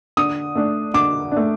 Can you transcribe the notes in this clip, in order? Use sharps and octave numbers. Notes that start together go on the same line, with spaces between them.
D3 D#6
A3 D4
D3 D6
A3 D4